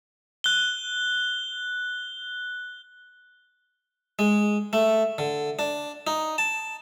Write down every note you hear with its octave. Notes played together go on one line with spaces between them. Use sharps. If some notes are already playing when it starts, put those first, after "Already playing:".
F#6 G7
G#3
A3
D3
D4
D#4
A5